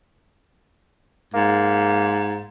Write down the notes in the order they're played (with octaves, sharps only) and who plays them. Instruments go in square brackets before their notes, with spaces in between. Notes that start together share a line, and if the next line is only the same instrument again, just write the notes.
[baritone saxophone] G#2 [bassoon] A#3